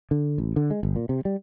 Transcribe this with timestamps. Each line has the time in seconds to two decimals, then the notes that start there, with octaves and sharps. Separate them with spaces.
0.11 D3
0.38 A1
0.56 D3
0.70 G#3
0.83 G1
0.96 A#2
1.09 C3
1.25 G3